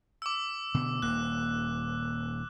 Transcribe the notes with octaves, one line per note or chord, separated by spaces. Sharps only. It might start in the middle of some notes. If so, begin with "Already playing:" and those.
D6 E6
B2 D3
D#1 A#3 F#6